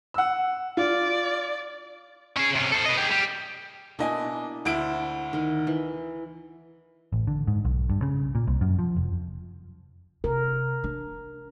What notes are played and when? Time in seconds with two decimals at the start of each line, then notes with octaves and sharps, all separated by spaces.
0.14 F#5 E6
0.77 F4 D5
2.37 C#4 G#4
2.56 C3 C#4
2.72 A4 C5
2.85 B4 D#5
2.97 G4 G#4
3.11 G3
3.99 B2 A#3 D4 E4 D#5 G#5
4.65 D2 E4 C5 F#5 D7
5.33 D#3 A#4 D#5
5.67 E3
7.12 A1
7.27 D3
7.47 G#2
7.65 B1
7.89 G2
8.02 C#3
8.35 A#2
8.47 C2
8.61 F#2
8.79 F3
8.96 F1
10.24 C3 A#4
10.84 D4